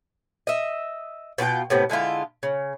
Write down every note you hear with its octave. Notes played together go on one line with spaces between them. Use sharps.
D#5 E5
B2 F4 G4 G5
A2 C3 B3
D3 G#3 E4 F4
C#3